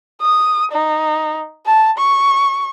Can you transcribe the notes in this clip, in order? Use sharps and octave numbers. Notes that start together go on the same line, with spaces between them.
D#6
D#4
A5
C#6